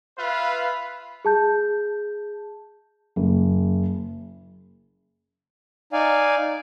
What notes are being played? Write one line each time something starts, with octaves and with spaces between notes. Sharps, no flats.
F4 B4 E5 F5
G#4 A5 G6
F#1
D#4 D5 F5 G#5